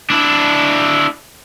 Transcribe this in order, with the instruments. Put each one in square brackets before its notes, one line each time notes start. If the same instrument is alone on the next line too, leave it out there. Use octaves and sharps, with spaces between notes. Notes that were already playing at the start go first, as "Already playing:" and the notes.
[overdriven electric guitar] D4 E4